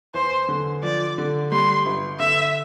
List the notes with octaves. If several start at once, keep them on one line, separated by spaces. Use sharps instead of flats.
E2 C5
D3
F3 D5
D3
G3 C6
G1
D3 E5